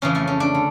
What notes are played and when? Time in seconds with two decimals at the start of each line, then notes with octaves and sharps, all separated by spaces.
0.02 F2 C#3 E3 C#4
0.15 A3
0.27 C#4
0.40 D4
0.55 D3